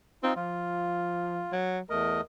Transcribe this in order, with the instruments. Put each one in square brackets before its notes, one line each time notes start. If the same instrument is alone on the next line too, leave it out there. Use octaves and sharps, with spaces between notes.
[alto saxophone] C4 [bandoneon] D#4 F4
[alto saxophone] F3 [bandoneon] F4
[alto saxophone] F#3
[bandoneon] E2 A3 D#5 [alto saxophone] A#4